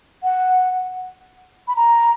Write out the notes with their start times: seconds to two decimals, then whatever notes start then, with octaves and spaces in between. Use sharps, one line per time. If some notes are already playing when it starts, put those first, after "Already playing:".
0.23 F#5
1.68 B5
1.76 A#5